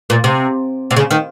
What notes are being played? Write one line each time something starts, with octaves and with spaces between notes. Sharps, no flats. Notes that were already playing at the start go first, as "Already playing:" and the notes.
A#2
C3
C3
C#3
D#3